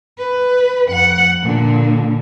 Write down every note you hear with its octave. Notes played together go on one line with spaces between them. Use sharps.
B4
F2 F#5
A#2 D3